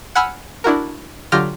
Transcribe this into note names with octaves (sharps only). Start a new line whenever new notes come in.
F#5 G#5 B5 E6 F6
D4 E4 F#4 A#4
D3 F#3 F4 G4 F6 A#6